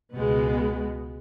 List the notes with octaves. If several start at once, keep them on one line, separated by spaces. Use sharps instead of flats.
C#2 B2 G#3 B3